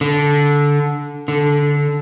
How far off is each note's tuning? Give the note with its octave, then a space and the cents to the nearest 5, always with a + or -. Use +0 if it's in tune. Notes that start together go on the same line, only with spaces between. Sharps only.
D3 -15
D3 -15